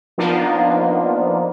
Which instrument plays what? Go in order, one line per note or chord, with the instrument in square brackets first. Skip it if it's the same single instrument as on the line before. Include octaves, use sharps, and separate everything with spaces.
[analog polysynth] F3 A#3 B3 D4 D#4 F4